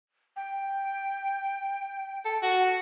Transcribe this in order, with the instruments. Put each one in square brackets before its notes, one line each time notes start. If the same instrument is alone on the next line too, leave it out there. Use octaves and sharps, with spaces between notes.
[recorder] G5
[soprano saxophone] A4
F#4